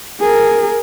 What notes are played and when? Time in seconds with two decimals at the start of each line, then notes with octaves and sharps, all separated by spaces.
0.21 G#4 A#4